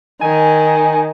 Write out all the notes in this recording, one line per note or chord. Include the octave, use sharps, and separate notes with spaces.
D#3 G#5